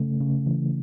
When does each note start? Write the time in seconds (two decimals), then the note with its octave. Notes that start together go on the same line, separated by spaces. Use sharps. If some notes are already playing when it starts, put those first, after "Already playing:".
Already playing: C#3 A3
0.21 C#3
0.47 E3